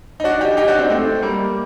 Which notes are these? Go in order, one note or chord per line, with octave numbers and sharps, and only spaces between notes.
D#4
D4 F#4
D#4 G4
D#4 G4
D4 F#4
C4 D#4
A3 C4
G3 A#3